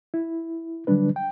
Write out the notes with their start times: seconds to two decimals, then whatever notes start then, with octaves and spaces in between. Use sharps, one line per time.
0.14 E4
0.87 D3 F#3 G3 D4 B4
1.16 G5